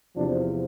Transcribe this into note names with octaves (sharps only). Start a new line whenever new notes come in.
E2 C3 F3 D4